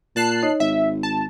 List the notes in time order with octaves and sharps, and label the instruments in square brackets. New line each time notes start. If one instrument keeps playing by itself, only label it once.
[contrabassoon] A#2 [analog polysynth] A5 F#6 C7
[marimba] D#4 C#5 D#5
[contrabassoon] G#1 [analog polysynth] E5
[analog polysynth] A5